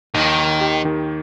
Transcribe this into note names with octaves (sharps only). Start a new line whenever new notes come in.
D#2 D#3
D#2
G4
D#3